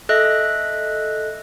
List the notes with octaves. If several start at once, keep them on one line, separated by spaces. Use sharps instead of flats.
A4 D#5 E5 F#6 A#6